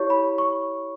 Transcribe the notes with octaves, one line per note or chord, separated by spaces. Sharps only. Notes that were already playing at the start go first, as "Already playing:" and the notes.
Already playing: E4 G4 C#5 C#6
B5
C#6